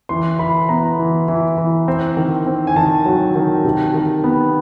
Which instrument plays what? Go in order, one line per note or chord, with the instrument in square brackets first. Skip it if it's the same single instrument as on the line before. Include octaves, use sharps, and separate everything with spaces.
[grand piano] E3 C6
E3 B5
B3 A#5
E3
E3
E3
C4
D#3
C4
G#5
D#3 A5
F#3
D#3
C3
D#3
B3